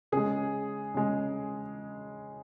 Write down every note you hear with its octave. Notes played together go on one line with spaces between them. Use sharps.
C#3 G#3 G#4
C#3 G#3